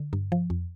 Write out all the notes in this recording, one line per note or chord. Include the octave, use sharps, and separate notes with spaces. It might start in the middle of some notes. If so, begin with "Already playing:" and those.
Already playing: D3
G2
F3
F2